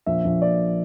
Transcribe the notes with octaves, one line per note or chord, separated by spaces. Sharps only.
A#1 E5
A#1
A#2 D5